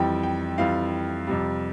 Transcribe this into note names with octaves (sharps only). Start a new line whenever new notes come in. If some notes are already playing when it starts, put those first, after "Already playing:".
Already playing: F2 E3 G3 G5
G5
F2 E3 G3 F5
F2 C3 G3